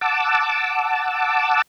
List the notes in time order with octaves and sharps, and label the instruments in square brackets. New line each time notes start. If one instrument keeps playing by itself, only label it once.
[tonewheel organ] F#5 A5 D6 E6